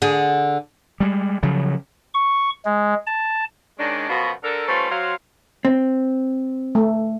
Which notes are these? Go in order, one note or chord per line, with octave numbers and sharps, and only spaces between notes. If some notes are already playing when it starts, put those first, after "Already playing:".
D3 G#4
G3 G#3
C#3 F3 F#3
C#6
G#3
A5
D#3 G#3 C#4 D4
F#2 B2 F3 F#4
D3 A4 A#4
G3 A3 C#4 F4 B4 C5
F#3 C5 F5
C4
A3